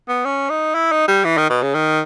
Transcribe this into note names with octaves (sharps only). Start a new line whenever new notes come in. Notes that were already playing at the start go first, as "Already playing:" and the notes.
B3
C#4
D#4
E4
D#4
G3
E3
D#3
B2
C#3
D#3